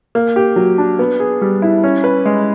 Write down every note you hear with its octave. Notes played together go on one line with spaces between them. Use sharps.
A#3
G4
F#3
D4
B3
G#4
G3
E4
C#4
B4
G#3